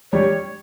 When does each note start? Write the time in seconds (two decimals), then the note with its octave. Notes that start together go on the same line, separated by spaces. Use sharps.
0.12 G3 C#5